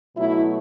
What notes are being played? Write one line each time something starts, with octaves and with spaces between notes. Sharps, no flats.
B2 F#3 A3 E4